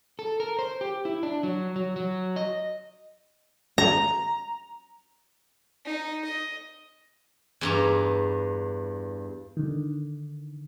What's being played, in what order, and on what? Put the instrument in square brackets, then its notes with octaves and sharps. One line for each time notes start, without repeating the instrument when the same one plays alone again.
[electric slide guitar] A4
A#4
C5
G4
E4
D4
F#3
F#3
F#3
D#5
[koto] A#5
[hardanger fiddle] D#4
D#5
[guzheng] E2 G2 A#5
[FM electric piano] D3 D#3